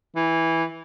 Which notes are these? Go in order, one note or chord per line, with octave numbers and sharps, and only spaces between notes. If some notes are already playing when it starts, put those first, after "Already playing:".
E3